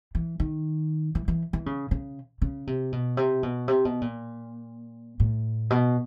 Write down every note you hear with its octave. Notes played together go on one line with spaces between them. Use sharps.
E3
D#3
E3
E3
E3
C#3
C#3
C#3
C3
B2
C3
B2
C3
B2
A#2
A2
B2